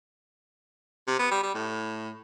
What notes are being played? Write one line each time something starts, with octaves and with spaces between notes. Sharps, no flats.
C3
B3
G3
G3
A2